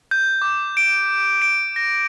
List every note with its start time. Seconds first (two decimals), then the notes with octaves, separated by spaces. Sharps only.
0.11 G6
0.42 D6
0.77 D7
1.42 D7
1.76 A#6